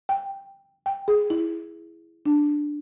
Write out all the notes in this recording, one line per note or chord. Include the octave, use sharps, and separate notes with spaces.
G5
G5
G#4
E4
D4